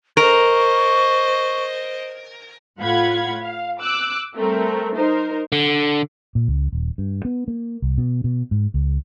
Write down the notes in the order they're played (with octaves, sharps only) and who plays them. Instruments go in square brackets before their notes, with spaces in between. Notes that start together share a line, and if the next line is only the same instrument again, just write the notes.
[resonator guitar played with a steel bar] A#4 [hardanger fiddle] C5 D#5 [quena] C#6
[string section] A2 F4 F5 F#5 B5 G#6
F5
D6 E6 F#6
G3 A3 C4 A#4
D#4 A#4 C5
[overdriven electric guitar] D3
[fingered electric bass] A#2
C#2
D#1
G2
B3
A#3
C2
B2
B2
G#2
C#2